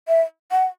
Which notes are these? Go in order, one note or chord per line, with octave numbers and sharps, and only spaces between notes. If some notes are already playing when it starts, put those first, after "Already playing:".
E5
F#5